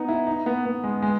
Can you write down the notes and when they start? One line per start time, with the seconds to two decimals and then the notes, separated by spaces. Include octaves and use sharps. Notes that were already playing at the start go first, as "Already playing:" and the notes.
Already playing: B3 D#4
0.08 E4
0.27 D#4
0.46 B3
0.65 B3
0.84 G#3
1.02 G#3